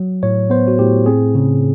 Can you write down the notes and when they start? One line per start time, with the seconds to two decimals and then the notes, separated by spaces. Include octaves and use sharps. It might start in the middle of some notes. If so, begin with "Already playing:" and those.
Already playing: F#3
0.23 A2 C#5
0.50 B3 C5
0.68 F#4
0.79 A2 G4
1.06 C4 G#4
1.35 C#3